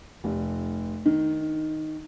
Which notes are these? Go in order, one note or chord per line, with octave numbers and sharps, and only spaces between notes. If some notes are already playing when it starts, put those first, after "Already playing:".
F1
D#3